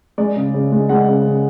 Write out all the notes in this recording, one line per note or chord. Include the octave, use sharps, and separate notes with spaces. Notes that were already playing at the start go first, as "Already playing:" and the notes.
G#3 D5
C#3
C#3
G#3
G#3 F#5
C#3
C#3